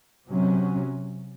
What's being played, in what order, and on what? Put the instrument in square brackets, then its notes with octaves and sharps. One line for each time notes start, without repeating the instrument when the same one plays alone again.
[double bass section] C3 F#3 C#4